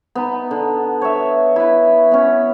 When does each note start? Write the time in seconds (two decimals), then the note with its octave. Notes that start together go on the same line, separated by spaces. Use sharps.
0.15 B3 D#4
0.51 D3
1.02 C#5 E5
1.56 E4 B4
2.11 B3 C#4